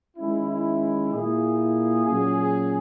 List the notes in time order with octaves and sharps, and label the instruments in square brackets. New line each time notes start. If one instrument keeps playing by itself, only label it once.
[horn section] D#3 G#3 C#4 E4
A#2 A#3 E4 G#4
A#2 F#3 C#4 G#4